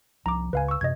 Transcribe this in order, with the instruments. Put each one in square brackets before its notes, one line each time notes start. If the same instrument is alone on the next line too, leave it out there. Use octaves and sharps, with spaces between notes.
[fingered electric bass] C2 F3 [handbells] A#5 D6
[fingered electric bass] C#2 C#3 [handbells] B4 F5 G#5
[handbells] C#6 E6
[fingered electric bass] F#2 C3 [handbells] D#5 G#6